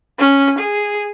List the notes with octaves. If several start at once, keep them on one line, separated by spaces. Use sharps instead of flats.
C#4
G#4